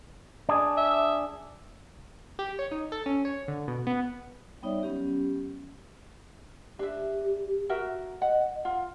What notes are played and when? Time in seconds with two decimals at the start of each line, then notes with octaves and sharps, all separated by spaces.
0.49 D4 G#4
0.77 E5
2.39 G4
2.59 C#5
2.71 D#4
2.92 A4
3.06 C#4
3.25 C#5
3.48 D3
3.68 B2
3.87 B3
4.62 G3 B3 D#4 C#5 D5 E5
4.83 F#3 B3 C#4 G4
6.79 D4 G4 E5
7.70 F#4 A#4 E5
8.22 D#5 F#5
8.65 F4 F#5